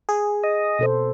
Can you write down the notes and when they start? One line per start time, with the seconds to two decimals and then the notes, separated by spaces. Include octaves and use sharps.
0.09 G#4
0.43 D#5
0.79 B2 A4 C5